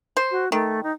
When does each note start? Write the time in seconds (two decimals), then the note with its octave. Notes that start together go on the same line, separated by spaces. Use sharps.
0.17 C5
0.31 F#4
0.52 D#3 A3
0.83 D#4